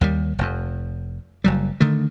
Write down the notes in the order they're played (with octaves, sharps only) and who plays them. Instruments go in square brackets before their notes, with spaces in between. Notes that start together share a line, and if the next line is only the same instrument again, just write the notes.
[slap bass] D#2 D#3 G3
F1 F2
F#1 F#3 G3
D3 D#3 A3